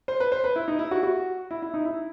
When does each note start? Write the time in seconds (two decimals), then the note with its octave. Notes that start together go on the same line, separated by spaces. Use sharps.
0.08 C5
0.20 B4
0.32 C5
0.44 B4
0.56 E4
0.68 D#4
0.79 E4
0.91 F#4
1.03 F#4
1.51 E4
1.62 E4
1.74 D#4
1.85 E4